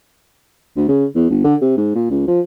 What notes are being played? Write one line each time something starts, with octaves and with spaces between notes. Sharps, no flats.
D2
C#3
E2
G1
D3
C3
G#2
A#2
C#2
F3